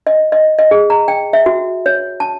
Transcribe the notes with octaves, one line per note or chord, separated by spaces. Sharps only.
D#5
D#5
D#5
G#4
A#5
G5
E5
F#4
C#5
A5